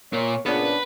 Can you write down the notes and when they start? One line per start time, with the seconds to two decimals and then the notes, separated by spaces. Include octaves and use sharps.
0.13 A#2 A#3 C#5
0.46 A#2 C#3 B3 D4 B4